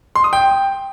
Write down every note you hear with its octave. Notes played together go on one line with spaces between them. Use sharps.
C6
D#6
G5